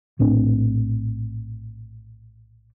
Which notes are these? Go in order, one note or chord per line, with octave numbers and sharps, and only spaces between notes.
A#1 A2 C4 D4